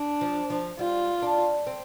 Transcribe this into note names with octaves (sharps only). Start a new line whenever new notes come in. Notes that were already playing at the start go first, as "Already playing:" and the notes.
Already playing: D4
F3
F3
G3 F4
D4
C4